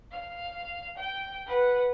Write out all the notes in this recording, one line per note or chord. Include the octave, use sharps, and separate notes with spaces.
F5
G5
B4 F#5